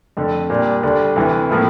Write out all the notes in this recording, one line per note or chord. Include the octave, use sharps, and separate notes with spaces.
F2 D3 A3
A#2 G3 D4
D2 D3 G3 D4
D2 C3 E3
A2 F3 A#3 E4